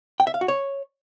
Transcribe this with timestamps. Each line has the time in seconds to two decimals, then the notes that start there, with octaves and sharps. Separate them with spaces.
0.20 G5
0.27 E5
0.34 F5
0.41 F#4
0.48 C#5